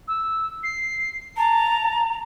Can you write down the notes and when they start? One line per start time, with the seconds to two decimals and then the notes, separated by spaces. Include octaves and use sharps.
0.07 E6
0.63 C7
1.37 A5 A#5